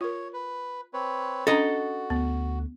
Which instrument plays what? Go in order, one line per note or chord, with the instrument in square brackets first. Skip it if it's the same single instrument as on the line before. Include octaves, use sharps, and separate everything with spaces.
[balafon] F4 A#4 [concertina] C#5
[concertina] B4
C4 B4 C#5
[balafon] C#4 D4 A#5 [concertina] F#4 [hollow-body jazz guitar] A4 D#5
[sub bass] D2 [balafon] B3